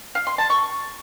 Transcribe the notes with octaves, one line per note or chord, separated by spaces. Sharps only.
F5
C6
A5
C#6